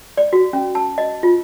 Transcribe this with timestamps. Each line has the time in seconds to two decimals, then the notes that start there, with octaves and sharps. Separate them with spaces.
0.17 D5
0.33 F#4
0.53 C#4
0.75 A5
0.98 D#5
1.23 F4